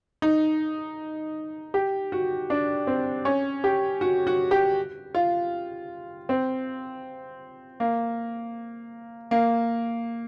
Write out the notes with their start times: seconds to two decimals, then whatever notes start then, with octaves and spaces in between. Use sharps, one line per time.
0.22 D#4
1.74 G4
2.12 F#4
2.50 D4
2.87 C4
3.25 C#4
3.64 G4
4.01 F#4
4.27 F#4
4.51 G4
5.15 F4
6.29 C4
7.80 A#3
9.31 A#3